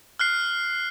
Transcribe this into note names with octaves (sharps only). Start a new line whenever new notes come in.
F6 F#6 C7